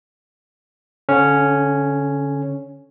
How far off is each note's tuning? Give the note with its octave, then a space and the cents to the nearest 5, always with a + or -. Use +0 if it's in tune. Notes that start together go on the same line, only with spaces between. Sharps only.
D3 -30 C#4 +0